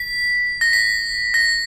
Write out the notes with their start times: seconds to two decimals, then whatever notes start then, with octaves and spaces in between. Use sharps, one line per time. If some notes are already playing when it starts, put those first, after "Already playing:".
Already playing: B6
0.61 A#6
0.73 B6
1.34 A#6